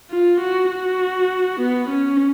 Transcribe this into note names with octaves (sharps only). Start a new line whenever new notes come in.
F4
F#4
F#4
B3
C#4